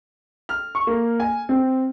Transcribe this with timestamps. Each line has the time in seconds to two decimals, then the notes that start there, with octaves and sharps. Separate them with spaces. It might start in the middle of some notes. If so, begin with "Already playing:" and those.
0.49 F6
0.75 C#6
0.87 A#3
1.20 G#5
1.49 C4